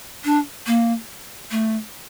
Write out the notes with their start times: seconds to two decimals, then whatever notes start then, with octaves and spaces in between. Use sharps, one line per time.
0.25 D4
0.67 A#3
1.51 A3